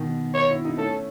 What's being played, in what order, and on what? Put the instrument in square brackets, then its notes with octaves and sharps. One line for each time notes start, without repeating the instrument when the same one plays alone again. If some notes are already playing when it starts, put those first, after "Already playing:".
Already playing: [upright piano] B2 D#3
[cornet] C#5
[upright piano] E4
D#4
[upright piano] A3 C#4 [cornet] A4